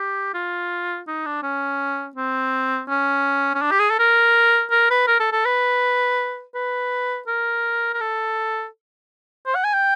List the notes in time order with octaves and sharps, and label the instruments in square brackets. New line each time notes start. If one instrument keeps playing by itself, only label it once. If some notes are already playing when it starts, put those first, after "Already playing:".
Already playing: [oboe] G4
F4
D#4
D4
C#4
C4
C#4
C#4
D4
G4
G#4
A4
A#4
A#4
B4
A#4
A4
A4
B4
B4
A#4
A#4
A4
C5
F#5
G#5
G5